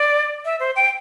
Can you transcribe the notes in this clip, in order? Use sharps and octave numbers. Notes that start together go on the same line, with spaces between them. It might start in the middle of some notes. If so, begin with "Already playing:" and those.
Already playing: D5
E5
C5
G5